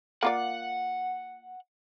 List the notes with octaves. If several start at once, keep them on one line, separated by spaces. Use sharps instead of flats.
A#3 F4 D5 F#5